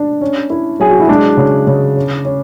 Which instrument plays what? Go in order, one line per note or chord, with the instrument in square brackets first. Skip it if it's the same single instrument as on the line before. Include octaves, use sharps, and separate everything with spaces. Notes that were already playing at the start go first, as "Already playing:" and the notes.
Already playing: [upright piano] D4
C#4
E4
[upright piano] F#3 [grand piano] G#4
[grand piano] F#4
E4
[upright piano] G#3 [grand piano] D4
[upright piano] C#3
C#3
C#4
C#4